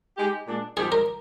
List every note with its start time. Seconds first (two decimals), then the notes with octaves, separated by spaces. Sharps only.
0.18 G#3 D#4 G4
0.46 A#2 G#3 D4
0.76 F3 C4 D#4 G4 G#4
0.92 A#4